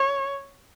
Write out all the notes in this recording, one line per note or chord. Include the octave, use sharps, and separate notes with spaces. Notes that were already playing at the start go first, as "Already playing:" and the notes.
Already playing: C#5